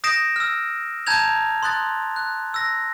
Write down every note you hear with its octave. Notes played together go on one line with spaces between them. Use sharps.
D#6 G6 A#6 C7 D7 E7
E6 F6
A5 A#5 G6 G#6 F7
C6 D#6 F#6 A6
F#6
E6 A#6